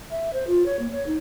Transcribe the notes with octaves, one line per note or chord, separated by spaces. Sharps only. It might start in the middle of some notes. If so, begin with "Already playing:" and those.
E5
C5
F4
C#5
A#3
C#5
D#4